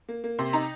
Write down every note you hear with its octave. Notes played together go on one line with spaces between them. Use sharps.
A#3
A#3
C3 C6
D#4 A#5